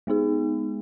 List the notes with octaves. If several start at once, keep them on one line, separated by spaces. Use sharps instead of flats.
G#3 B3 D#4 G#4